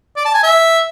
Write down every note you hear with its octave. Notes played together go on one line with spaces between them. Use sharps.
D5
A5
G#5
E5